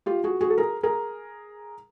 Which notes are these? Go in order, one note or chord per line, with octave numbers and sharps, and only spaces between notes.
F4 G4
F#4 G#4
F#4 G#4
A4
G#4 A#4
G#4 A#4